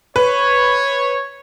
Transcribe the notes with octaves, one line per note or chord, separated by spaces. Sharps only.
B4 C#5